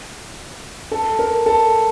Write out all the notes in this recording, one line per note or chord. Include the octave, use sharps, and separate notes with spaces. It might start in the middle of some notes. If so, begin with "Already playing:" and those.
A4
A#4
A4